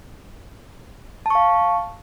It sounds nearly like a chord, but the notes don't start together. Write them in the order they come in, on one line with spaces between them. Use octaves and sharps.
A5 C#6 F5